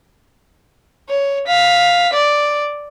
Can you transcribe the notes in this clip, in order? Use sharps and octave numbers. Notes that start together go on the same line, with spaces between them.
C#5
F5 B6
D5